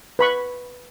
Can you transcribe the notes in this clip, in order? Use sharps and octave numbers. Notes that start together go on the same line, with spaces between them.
B4 B5 C#6